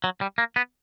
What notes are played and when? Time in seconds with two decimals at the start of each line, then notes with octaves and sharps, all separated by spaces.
0.04 F#3
0.21 G3
0.38 A#3
0.56 B3